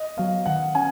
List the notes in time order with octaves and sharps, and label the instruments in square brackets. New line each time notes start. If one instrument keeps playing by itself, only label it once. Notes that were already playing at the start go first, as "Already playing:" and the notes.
Already playing: [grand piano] D#5
[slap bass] F#3 B3 [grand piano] F5
[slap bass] D#3 [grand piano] F#5
[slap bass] C#4 [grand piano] G#5